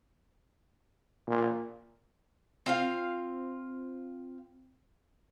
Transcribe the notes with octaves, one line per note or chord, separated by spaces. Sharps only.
A#2
C4 F4 F5